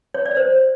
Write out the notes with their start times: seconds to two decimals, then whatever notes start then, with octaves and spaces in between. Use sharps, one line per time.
0.14 C#5
0.26 D5
0.37 C5